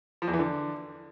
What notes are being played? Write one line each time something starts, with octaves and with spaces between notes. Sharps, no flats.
F3
E2
E3
D3